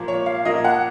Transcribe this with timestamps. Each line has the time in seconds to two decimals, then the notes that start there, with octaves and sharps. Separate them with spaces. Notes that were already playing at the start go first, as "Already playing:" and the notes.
Already playing: A#2 F3 A#3
0.08 C#5
0.26 F5
0.45 A#2 F3 A#3 D#5
0.64 F#5